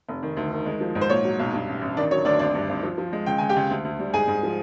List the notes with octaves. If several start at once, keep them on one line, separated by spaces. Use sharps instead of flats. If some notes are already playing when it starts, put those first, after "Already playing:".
F1
D#3
D2
D#3
G#3
F3
G#2
C5
A#2 C#5
F#3
B1
G2
A1
A1
D#3 D4 D5
F#3 C#5
D2 D4 D5
G#1 D4 D5
G2
G#1
F3
F3
G#3
C#2 G5
C#2 G#5
G4 G5
C#2
D2
D2
G3
G#2 G#4 G#5
G#2
F3